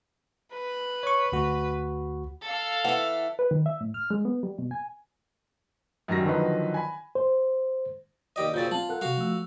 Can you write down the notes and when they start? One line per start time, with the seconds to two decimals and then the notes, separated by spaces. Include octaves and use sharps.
0.54 B4
1.03 C#5 C#6
1.32 D2 F#4
2.45 A4 F5
2.85 E3 E4 F#5
3.39 B4
3.51 D#3
3.66 E5
3.81 A2
3.94 F6
4.10 G#3
4.25 B3
4.43 G3
4.58 B2
4.71 G#5
6.08 F#2 D#3 F#3 G3 A#6
6.25 D3 D#3 F3 F#3 D#4 B4
6.74 G#5 B5
7.15 C5
8.36 D#2 G4 D5 D#5 A#6
8.54 A#2 C#3 C4 F4 F#4 C5 G6 A6
8.71 G3 C4 F4 A5 F#7
8.89 A4 A#4 F#5 F#6
9.01 C3 G3 F#4 F5
9.17 F3 A3 E6